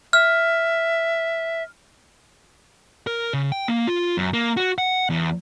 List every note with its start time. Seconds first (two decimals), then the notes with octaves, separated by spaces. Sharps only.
0.13 E5 F6
3.07 A#4
3.33 C#3
3.52 G5
3.68 A#3
3.87 F4
4.17 F#2
4.33 A#3
4.57 F#4
4.78 F#5
5.10 E2